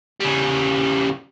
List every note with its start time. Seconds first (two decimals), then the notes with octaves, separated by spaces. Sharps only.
0.21 C#3 G3